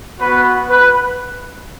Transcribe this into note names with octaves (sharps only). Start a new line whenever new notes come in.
B3 F#4 B4
B4